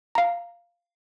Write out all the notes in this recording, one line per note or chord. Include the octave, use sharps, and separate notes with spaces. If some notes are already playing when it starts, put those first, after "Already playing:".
F5 A#5